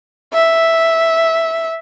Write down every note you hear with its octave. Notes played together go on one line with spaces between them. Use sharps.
E5